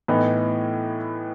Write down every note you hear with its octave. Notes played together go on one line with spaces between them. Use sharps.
A2 E3 B3 D#4